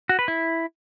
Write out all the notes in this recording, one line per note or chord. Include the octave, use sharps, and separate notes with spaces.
F#4
B4
E4